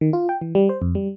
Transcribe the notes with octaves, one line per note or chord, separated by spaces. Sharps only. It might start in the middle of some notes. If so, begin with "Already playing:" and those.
D#3
F4
G5
E3
G3
C5
F2
G3